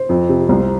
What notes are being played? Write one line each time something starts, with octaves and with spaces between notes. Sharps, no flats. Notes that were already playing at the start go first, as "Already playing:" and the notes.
Already playing: C5
F2
C3
C2 C5